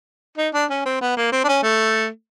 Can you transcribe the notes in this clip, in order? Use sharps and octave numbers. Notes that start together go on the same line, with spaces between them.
D#4
D4
C#4
C4
B3
A#3
C4
D4
C#4
A3